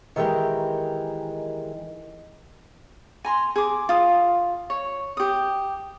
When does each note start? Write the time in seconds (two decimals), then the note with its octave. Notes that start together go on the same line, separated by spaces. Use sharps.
0.16 D#3 E3 G#3 G4 A#4
3.25 G#5 A#5 C6
3.56 G#4 D6
3.89 F4 D#6
4.70 C#5
5.17 G4 D#6